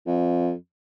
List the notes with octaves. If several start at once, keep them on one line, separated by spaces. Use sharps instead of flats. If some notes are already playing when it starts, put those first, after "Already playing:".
F2